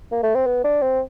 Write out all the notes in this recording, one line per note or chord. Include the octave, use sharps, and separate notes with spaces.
A#3
A3
C4
B3
D4
C4